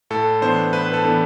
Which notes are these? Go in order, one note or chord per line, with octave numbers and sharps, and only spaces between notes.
A2 A4
E3 B3 D4 C5
A2 B4
A4
E3 B3 D4